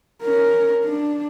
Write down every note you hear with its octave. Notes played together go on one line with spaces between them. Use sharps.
C#4 A#4
D4